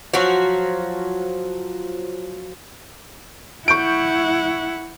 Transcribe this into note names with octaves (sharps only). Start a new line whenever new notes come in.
F3 F#3 F#4
E4 F#5 C#6 G6 D7